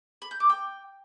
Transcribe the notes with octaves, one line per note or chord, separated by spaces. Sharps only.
B5
G6
D6
G5